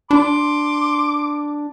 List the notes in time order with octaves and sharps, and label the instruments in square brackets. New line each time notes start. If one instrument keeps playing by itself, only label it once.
[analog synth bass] D4 [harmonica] C6 [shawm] D6